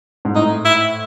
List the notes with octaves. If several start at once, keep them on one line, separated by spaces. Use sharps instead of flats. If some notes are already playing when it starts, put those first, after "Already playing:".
G#2
A2 D#4
E4